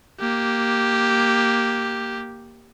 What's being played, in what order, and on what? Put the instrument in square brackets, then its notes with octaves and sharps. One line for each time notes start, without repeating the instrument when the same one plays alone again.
[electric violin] A#3 G4